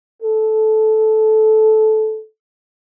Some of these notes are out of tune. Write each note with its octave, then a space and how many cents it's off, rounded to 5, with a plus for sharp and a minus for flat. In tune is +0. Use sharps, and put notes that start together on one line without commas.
A4 -15